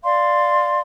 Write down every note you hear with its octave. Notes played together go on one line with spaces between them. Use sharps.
D5 F5 C6